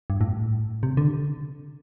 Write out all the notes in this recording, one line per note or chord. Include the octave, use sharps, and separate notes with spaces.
G2
A2
C3
D3